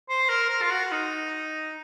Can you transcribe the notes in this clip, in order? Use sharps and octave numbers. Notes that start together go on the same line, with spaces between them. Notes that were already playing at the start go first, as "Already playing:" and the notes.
C5
A#4
A#4
F4
F#4
D#4